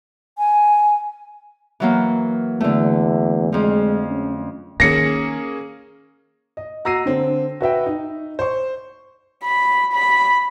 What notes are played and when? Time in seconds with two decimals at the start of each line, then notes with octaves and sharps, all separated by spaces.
0.38 G#5
1.80 E3 F#3 A#3
2.60 E2 D3 A3
3.52 F2 F3 G#3
4.09 C#4
4.80 D#3 A#3 C#4 G#4 A#6 C#7
6.57 D#5
6.85 F#4 A#5 E6 A#6 C7 D#7
7.06 D3 C4
7.61 F#4 B4 E5 G5
7.86 D#4
8.39 C5 C#6
9.43 B5
9.93 B5